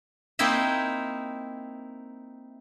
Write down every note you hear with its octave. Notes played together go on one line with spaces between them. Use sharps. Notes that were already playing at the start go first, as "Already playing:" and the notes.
A#3 C4 D#4 E4 E5